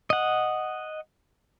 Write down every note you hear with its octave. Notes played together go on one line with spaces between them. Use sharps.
D#5 F#5